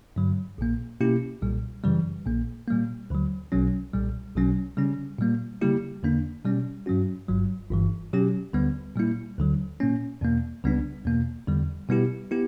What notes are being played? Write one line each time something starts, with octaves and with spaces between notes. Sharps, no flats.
G2 D3 F#3
A#1 A#2 A#3
B2 A#3 C#4 E4 G4
B1 A#2 G3
F#2 C#3 E3 G3
A#1 A#2 A#3
A#2 G3 A#3
D2 D3 F#3
B1 B2 F#3 C#4
B1 A#2 G3
B1 B2 F#3 C#4
C#3 G3 C#4
A#2 G3 A#3
C#3 G3 A#3 E4 G4
E2 D3 A#3 D4
B2 G3 C#4
G2 F#3 C#4 F#4
G1 G2 F#3
G1 G2 E3
B2 F#3 C#4 G4
D2 D3 G3 B3
A#2 G3 A#3 E4
D2 D3 F#3
A#2 A#3 C#4
E2 B2 A#3
C#2 C#3 G3 B3 D4
E2 B2 A#3
E2 D3 G3
B2 G3 B3 E4 G4
B3 E4 G4